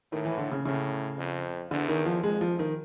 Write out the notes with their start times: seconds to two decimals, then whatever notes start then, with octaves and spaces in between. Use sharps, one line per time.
0.11 A2 D#3
0.25 E3
0.38 D3
0.52 C#3
0.65 A2 C#3
1.18 F2
1.71 E2 D3
1.89 D#3
2.06 F3
2.23 F2 G#3
2.41 F3
2.59 D#3